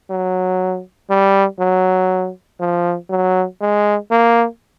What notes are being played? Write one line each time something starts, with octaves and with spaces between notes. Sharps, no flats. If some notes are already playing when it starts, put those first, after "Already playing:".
F#3
G3
F#3
F3
F#3
G#3
A#3